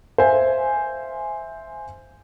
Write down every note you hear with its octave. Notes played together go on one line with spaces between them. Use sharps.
C5 E5 F5 G#5